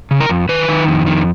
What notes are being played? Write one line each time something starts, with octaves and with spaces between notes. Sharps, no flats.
C#3
A#4
F2
D#3 B4
D#3
F2
D#3